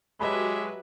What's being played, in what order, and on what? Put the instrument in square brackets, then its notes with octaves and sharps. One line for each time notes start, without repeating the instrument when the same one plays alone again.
[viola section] F#3 B4 [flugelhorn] G#3 [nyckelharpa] G4 E5 [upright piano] D#5 A5 B5